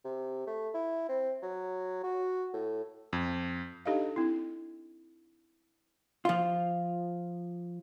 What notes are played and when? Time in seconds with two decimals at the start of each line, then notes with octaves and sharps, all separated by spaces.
0.05 C3
0.47 A3
0.74 E4
1.09 C4
1.43 F#3
2.03 F#4
2.53 A2
3.13 F2
3.86 D4 D#4 G4 A4 D#5 F5
4.16 C4 E4
6.25 F3 F4